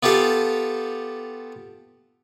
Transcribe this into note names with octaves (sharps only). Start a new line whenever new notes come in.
B3 F4 G4 A4 F5